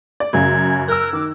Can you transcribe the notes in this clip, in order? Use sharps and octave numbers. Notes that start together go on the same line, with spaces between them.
D5
F#2 C#3 G#6
A#4 E6 F#6
D#3 D6